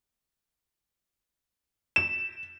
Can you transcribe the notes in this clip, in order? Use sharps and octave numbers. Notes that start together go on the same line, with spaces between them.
E7